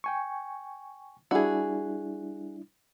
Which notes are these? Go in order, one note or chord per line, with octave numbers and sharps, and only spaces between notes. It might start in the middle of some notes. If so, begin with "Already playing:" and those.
G5 G#5 C#6
G3 D4 E4 F#4 G#4